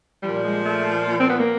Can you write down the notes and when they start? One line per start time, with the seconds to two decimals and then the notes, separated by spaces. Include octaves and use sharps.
0.23 A#2 F3 G3
0.43 G#3
0.65 A3
1.07 A#3
1.19 C4
1.29 B3
1.39 A#3